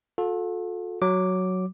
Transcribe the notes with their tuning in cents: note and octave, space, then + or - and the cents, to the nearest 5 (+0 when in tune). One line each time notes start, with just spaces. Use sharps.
F4 +45 A4 -10
F#3 +0 D6 +0